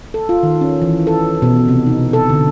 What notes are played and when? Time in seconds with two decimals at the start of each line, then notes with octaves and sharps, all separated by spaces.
0.14 A4
0.29 F4
0.43 D#3
0.61 C#4
0.82 E3
1.07 A4
1.42 B2
1.69 C3
1.87 D#4
2.13 A4
2.29 D3